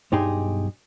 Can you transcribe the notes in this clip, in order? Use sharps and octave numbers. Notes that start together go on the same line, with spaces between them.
B1 G2 D#4 G4 G#4 C6